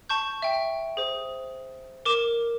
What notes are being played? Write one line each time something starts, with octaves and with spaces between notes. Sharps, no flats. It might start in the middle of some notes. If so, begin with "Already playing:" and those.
A5 C#6 G6
E5 G5
G#4 C5
A#4 D6 E7